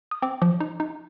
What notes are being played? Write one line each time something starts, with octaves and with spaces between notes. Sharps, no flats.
D#6
C4 D6
F3 D6
D#4
D#4